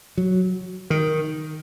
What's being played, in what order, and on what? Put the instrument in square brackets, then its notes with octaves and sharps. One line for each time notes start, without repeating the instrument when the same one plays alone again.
[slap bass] F#3
D#3